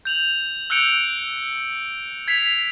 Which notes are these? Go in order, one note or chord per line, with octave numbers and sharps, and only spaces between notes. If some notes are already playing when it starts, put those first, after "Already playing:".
G6 F7 F#7
E6 F#6 G6 C#7 D7 F7
G#6 B6 C7 F7